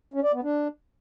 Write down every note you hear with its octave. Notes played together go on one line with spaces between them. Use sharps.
C#4
D5
B3
D4